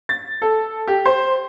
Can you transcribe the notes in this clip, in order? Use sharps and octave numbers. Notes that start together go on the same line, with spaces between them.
A6
A4
G4
C5